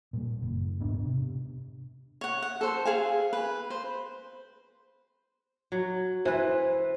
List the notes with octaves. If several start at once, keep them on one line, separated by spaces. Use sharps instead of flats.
A#2 G3
F#1
E1 G#2 B3 D4
C3
C#5 F#5
F#5
A4 C5
G#4 F5 G#5
B4
C5
F#3
E3 B4 C5